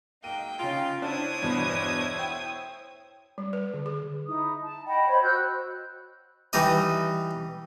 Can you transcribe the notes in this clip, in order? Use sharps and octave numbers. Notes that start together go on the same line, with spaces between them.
F#3 G#3 A#3 D#4 G5 D#7
C#3 C#4 D#4 F4
A3 B3 D4 E4 C5 C#5 D#6 G#6
E2 G2 B2
G5
G3
B4
D3
G#4
D#4 E4 D#6
A5
D#5 F#5 G5 B5
C5 C#5 B5
F#4 E6 F#6 G6
E3 G3 D#4 D#5